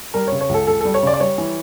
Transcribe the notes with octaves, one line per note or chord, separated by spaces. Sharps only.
G3 A#4
C#5
C#3
C#5
C#2 A4
C#2 A4
G3 A4
C#5
C#3 D5
D5
G3 C#5
E3